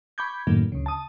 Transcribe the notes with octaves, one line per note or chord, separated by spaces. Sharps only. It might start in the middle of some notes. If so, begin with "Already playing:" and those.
B5 C#6 D6 G6 G#6
F#2 A2 D#3 F#3 A#3
D2 C#3
A5 D#6